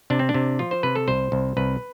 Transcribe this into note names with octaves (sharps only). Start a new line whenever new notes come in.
C3 D4
C4
D4
C3
F3 F4
C5
C3 B4
A4
C2 C5
C2
C2 B4